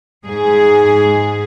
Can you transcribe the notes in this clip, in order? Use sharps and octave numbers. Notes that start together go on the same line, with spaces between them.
G#2 G#4